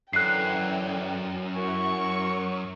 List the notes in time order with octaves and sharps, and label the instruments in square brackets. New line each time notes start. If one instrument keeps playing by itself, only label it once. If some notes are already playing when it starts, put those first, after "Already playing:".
[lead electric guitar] F#2 [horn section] D3 E3 [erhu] G5 [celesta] F#6 C7
[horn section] E4 F#4 A#4 [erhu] C#6